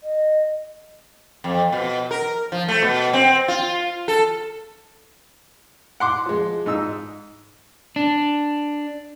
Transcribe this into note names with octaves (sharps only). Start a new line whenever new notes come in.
D#5
F2
B2
A#4
F3
A3
B2
C4
F4
A4
F#5 C6 D6
F3 G#3
G#2 D#4 E6
D4